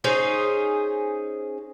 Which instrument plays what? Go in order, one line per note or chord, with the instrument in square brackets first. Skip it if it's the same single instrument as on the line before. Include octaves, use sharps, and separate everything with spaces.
[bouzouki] C#4 D#4 G#4 C5